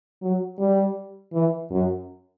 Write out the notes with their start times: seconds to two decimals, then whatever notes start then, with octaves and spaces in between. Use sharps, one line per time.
0.22 F#3
0.59 G3
1.33 E3
1.71 F#2